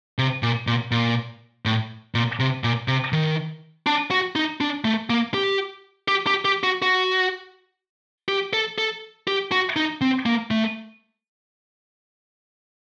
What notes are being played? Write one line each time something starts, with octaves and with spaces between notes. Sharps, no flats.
C3
A#2
A#2
A#2
A2
A#2
C3
A#2
C3
D#3
D4
F#4
D#4
D4
A3
A#3
G4
G4
G4
G4
F#4
F#4
G4
A4
A4
G4
F#4
D#4
C4
A#3
A3